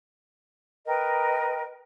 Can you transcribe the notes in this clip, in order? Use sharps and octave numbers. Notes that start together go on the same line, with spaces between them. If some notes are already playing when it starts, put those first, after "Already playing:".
A#4 B4 D#5 G5